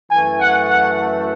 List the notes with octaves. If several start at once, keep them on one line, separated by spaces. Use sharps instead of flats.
F#2 E3 A3 G#5
F#5
F#5